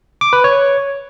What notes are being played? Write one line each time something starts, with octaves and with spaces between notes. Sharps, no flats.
D6
B4
C#5